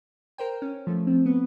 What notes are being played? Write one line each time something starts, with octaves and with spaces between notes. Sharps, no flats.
A#4 C5 G5
C#4
F3 A3
F3 C4
B3